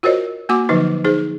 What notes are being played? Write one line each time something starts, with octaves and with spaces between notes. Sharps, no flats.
F4 F#4 A#4 C5 C#5 D#5
A#3 F#4 F#5 D6
D3 F3 F#3 D#4 B4
D#4 G#4 C5